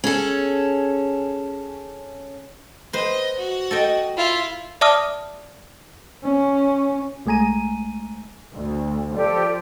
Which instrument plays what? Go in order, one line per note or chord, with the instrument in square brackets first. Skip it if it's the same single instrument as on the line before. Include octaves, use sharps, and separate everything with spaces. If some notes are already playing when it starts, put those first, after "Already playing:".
[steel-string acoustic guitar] C#4 G#4 A4
[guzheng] B4 C5 [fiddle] D#5
[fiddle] F#4
[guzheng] A4 D#5 G5
[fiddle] E4 F4
[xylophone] D5 E5 A5 D6 D#6 F6
[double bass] C#4
[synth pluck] B1 G#3 A3 G#5 A#5 D#7
[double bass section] D2
[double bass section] F3 [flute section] G4 A4 [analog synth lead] D5